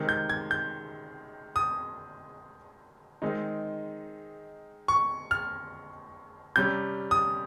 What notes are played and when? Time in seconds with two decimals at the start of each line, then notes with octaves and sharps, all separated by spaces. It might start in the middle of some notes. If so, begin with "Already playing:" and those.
Already playing: C3 D#3 G#3 C4
0.09 G6
0.29 G#6
0.51 G6
1.56 D#6
3.22 D#3 G#3 C4 D#4
4.88 C#6
5.31 F6
6.56 C3 G3 C#4 G6
7.11 D#6